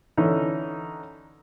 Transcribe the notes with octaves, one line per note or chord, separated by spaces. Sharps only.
D3 E3 C#4 D#4